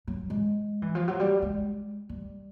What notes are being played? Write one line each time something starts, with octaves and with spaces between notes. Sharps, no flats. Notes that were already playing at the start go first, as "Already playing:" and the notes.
F#3
G#3
E3
F3
F#3
G3
G#3
G3